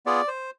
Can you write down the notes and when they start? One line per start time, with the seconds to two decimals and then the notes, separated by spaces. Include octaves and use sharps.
0.06 B3 F4 G#4 D5
0.28 C5